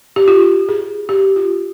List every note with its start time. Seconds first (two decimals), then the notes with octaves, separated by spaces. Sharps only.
0.16 G4
0.28 F4
0.69 G#4
1.09 G4
1.36 F4